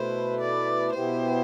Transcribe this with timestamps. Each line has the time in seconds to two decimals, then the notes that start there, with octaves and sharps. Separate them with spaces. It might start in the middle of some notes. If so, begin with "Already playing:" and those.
Already playing: B2 A3 E4 B4 C5
0.40 D5
0.94 B2 B3 E4 G4 C5